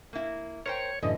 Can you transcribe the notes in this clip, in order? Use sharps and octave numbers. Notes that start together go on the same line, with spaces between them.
A#3 E4
A#4 C5 C#5 G5
F#2 A2 D3 E3 D#5